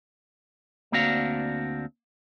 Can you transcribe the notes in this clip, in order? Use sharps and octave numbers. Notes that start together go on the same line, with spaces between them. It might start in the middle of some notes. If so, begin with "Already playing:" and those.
D2 A#3 C4 D4 F#4 F5